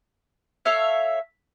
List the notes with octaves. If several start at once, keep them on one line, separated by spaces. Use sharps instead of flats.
A4 C#5 E5 F5